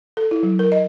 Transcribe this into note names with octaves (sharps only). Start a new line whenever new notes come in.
A4
E4
F#3
A#4
D#5